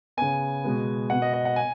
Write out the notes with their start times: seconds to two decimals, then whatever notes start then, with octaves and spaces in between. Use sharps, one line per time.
0.17 C#3 B3 G#5
0.64 B2 G#3 B3
1.10 B2 B3 F#5
1.22 D#5
1.33 D#5
1.45 F#5
1.56 G#5